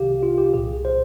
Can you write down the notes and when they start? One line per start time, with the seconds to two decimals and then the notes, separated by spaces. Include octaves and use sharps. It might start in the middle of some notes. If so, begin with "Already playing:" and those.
Already playing: C2 C3 D#3 G4 F5
0.23 F4
0.38 G4
0.54 C2 A#2 G#4
0.85 C5